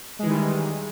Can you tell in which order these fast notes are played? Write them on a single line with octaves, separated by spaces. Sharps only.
G#3 E3 D#3 G3